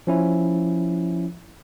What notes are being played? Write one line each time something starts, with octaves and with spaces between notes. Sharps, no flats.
F3 C#4 E4